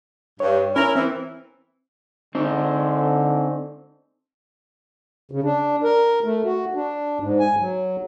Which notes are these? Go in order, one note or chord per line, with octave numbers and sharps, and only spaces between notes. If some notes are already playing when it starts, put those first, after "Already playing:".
G2 C#5
C#4 E4 A#4
E3 C4 E4
D3 C4 D#4
C#3
D4
A#4
A3
F#4
D4
G#2
G#5
F#3